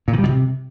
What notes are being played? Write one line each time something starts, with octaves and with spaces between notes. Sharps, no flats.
A#2
D#3
G3
B2
C3